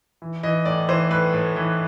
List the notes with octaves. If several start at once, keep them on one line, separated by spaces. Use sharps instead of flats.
E3
E3 D#5
A2 D5
E3 C5
A2 B4
A2
E3